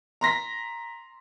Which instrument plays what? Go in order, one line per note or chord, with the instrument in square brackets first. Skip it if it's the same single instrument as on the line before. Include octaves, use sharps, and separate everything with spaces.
[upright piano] A#5 C6 A#6 B6